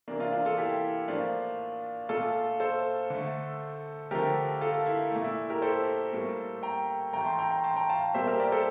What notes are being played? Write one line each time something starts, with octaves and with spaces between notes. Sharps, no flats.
C3 E3 A#3 D4
D4 F4
D4 F4
F4 A4
E4 G4
A2 F3 A#3 D4 F4
A#2 A3 F4 A4
A4 C5
D3 A3
D3 F3 A3 G4 A#4
F4 A4
E4
A#2 A3
E4
G4 A#4
A4 C5
A2 G3 A#3
G5 A#5
A2 E3 A3 G5 A#5
A5 C6
G5 A#5
G5 A#5
A5 C6
G5 A#5
F5 A5
A#2 G3 A#3 C5 E5
G4 A#4
A#4 D5
A4 C5